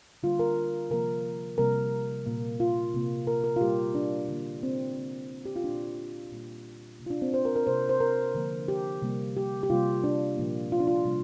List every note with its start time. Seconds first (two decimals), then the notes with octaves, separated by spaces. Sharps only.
0.23 D3 G3 A#3 F4
0.39 A#4
0.90 C3 F3 A#3 A#4
1.58 C3 G3 A#3 A#4
2.26 A#2 A#3
2.60 F4
2.94 C3 A#3
3.27 A#4
3.44 A#4
3.56 F4
3.61 A#2 G3 A#3 G4
3.95 D4
4.28 D3 G3 A#3
4.63 C4
4.96 D3 A#3
5.46 G4
5.56 F4
5.64 A#2 A#3 D4
6.32 A#2 G3 A#3
6.99 C3 A#3
7.06 F4
7.10 D4
7.22 C4
7.34 C5
7.45 A#4
7.56 A#4
7.67 C3 A#3 C5
7.89 C5
8.00 A#4
8.35 D3 F3 A#3
8.68 G4
9.02 C3 G3 A#3
9.37 G4
9.63 G4
9.70 C3 G3 A#3 F4
10.04 D4
10.37 A#2 F3 A#3
10.72 F4
10.80 D4
10.87 F4
11.05 C3 G3 A#3